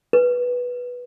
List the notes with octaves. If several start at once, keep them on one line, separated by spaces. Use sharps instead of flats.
B4